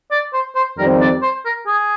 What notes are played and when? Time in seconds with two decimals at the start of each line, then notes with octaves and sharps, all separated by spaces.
0.11 D5
0.33 C5
0.55 C5
0.78 F2 D#3 G3 C4 A#4
1.01 D5
1.22 C5
1.45 A#4
1.67 G#4